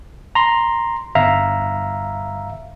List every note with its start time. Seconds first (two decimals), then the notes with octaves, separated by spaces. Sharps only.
0.35 A#5 C6
1.15 G1 E5 F5 A#5